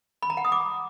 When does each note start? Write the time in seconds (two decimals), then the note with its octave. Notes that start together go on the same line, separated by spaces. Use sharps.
0.22 B5
0.30 A#5
0.37 F#5
0.45 D#6
0.52 D6